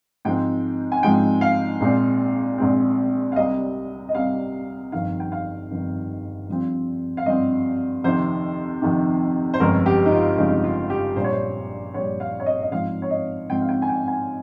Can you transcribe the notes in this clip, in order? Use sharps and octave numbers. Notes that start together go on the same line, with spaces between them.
G#2 F3 G#3 C4 G5
G#5
G#2 F3 G#3 C4 G5
F5
A#1 A#2 G#3 C4
A#1 A#2 G#3 C4
F5
C2 C3 G3 D#5
D#5
C2 C3 G3 F5
G1 F2 D#3 F5
G5
F5
G1 F2 D#3
G2 F3 C4
F5
G2 F3 C4 D#5
F2 C3 D#3 C5
F2 C3 D#3
C5
G1 F2 C#3 G#3 C#4 A#4
G4
D#4
F4
G1 F2 C#3 G#3 C#4 D#4
F4
G4
A#1 A#2 G3 C5
C#5
C5
A#1 A#2 G3 C#5
F5
C#5
D#5
D#5
G#2 F3 C4 F5
C#5
D#5
G#2 F3 C4 G5
F5
G5
G#5
G5
G#5